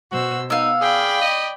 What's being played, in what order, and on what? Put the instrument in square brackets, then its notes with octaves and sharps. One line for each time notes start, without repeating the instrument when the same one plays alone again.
[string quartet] B2 C5 E6 [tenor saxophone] F#4
[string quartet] B3 [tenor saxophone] D#4 [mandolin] F5 E6
[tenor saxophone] G#4 [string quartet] D5 G5 B5
[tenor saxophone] D#5